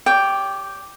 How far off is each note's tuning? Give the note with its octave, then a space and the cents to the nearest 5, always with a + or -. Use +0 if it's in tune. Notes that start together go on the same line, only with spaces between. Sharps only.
G4 +0 C#5 +45 G5 +0